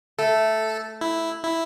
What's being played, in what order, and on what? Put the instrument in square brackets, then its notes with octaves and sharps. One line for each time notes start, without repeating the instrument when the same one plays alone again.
[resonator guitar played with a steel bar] A3 [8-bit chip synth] A4
[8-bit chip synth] E4
E4